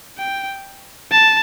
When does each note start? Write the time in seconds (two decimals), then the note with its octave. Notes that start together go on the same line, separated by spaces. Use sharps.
0.18 G5
1.11 A5